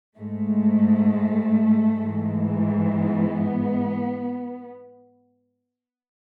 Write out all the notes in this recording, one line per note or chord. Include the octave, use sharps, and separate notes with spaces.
G#2 G#3 A3
G#2 E3 G#3
B3